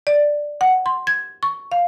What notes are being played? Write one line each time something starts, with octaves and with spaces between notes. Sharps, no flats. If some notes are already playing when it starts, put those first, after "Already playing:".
D5
F#5
C6
G#6
C#6
F5